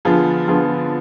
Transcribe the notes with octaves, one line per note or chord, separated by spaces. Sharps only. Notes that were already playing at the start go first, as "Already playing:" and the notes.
D3 F3 B3 F4 G#4
D3 F3 B3 F4 G#4